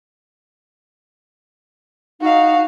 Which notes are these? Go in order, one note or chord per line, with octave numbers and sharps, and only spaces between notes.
D#4 F#4 F5